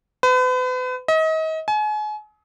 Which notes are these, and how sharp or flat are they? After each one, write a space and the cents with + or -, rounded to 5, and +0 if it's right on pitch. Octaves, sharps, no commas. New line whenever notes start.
B4 +40
D#5 +35
G#5 +35